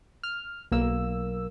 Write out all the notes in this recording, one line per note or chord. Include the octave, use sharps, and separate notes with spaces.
F6
B1 A#3 E6